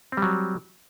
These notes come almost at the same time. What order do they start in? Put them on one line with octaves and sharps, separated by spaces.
C4 G3 F#3